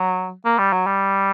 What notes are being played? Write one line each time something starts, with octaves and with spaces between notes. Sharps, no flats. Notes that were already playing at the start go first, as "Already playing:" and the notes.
Already playing: F#3
A#3
G3
F#3
G3